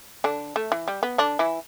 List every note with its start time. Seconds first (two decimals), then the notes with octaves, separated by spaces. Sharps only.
0.24 D3 D4
0.56 A3
0.72 E3
0.88 G3
1.03 B3
1.18 D3 D4
1.39 E3 E4